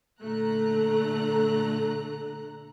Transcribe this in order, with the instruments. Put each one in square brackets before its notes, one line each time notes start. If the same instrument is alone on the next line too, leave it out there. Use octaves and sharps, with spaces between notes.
[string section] A#2 D3 A3 A#5 F#6